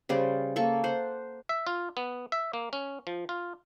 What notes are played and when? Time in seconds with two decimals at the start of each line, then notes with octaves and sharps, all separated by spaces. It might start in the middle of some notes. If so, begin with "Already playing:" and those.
0.09 C#3 G3 C5 D5
0.56 A#3 A4 C#6
0.84 C5 F#5
1.49 E5
1.67 F4
1.97 B3
2.32 E5
2.53 A#3
2.73 C#4
3.07 F3
3.29 F4